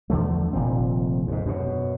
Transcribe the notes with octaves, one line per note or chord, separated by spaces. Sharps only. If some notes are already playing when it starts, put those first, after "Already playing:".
E2 D3 F3 A3
F1 A#2 D#3 C4
D#2 G#2
F#2 B2